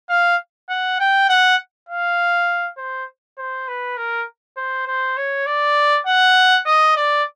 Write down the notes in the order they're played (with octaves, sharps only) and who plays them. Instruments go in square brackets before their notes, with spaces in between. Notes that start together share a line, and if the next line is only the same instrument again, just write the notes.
[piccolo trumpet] F5
F#5
G5
F#5
F5
C5
C5
B4
A#4
C5
C5
C#5
D5
F#5
D#5
D5